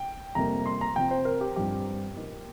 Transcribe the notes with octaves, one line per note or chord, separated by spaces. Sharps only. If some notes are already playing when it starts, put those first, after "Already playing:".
Already playing: G5
F2 C3 G3 A#3 A#5
C6
A#5
C3 F3 C4 G5
C5
A#4
G4
G2 F3 C4 D#4 G4
A#2 A#3 D#4